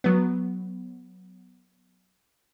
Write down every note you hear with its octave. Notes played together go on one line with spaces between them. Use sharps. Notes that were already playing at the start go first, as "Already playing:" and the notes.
F#3 B3